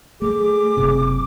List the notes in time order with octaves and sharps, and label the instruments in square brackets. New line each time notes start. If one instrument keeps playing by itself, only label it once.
[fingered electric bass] A3 [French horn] G#4 [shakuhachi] D6
[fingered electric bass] F#1 C3